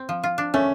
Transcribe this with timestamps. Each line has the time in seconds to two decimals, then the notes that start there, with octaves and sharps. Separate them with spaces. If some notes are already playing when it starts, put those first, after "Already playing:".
Already playing: C4
0.09 F3
0.24 F4
0.38 D4
0.54 A3 C#4